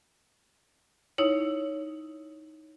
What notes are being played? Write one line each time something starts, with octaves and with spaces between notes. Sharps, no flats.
D#4 E4 C#5